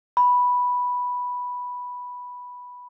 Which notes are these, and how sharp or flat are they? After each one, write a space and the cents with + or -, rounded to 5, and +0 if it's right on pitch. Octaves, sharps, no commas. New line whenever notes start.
B5 -5